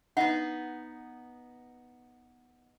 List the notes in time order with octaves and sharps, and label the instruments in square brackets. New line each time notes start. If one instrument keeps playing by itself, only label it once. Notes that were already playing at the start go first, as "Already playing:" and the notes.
[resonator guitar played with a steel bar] B3 D#4 [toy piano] F#5